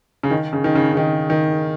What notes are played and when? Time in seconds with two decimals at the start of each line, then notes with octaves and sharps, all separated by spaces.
0.23 C#3
0.30 D#3
0.53 C#3
0.64 D#3
0.75 C#3
0.92 C#3
0.97 D#3
1.30 D#3